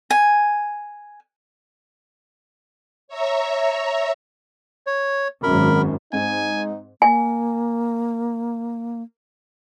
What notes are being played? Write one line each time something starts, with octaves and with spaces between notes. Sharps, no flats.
G#5
C#5 E5 A#5
C#5
G#1 F#2 A#4 B5
G#2 C4 D#4 G#5
A#3 G#5